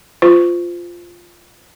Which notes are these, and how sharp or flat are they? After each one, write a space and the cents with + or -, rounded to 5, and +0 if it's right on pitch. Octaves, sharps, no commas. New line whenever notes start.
F4 +0 C5 -30